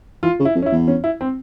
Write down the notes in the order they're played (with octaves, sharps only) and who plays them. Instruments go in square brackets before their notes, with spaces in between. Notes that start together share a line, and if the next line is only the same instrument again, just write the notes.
[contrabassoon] E3 [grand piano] F4
[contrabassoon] C#3
[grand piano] E4
[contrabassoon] F2
[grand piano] C#4
E4
[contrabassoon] E2
[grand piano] C#4
E4
C4